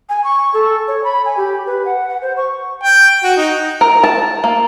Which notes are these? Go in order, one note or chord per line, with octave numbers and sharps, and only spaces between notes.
G#5
C#6
A4
C#5
B5
G#5
G4
B4
F#5
F#5
C5
C#6
G5
F#4
D#4
A#4
A5
A#3